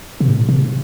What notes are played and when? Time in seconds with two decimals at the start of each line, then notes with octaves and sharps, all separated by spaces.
0.20 C3
0.28 A2
0.49 C3